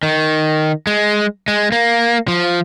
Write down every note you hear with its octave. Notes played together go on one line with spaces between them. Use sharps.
D#3
G#3
G#3
A#3
F3